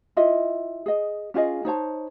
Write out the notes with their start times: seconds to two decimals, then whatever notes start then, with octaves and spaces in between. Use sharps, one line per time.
0.17 E4 F4 D#5 E5
0.86 G#4 D#5
1.34 C#4 F4 G#4 D#5
1.65 D#4 C5 C#5 A5